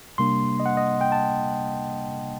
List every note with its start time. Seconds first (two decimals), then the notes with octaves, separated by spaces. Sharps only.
0.18 C3 G3 A#3 D4 C6
0.60 D#5
0.66 F#5
0.77 D#5
1.01 G5
1.12 A5